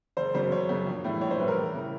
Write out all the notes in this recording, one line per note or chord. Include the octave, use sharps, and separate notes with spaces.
F#1 C5
F#2 C#3 F#3 C5
F#1 C#5
F#2 C#3 F#3
A#1
A2 E3 G3
A#1 C#5
C5
A2 E3 G3 B4
A#4
E1
C#3 E3